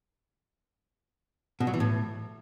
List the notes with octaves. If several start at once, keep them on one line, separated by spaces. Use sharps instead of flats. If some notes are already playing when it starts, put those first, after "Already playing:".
B2
F#3
E3
A2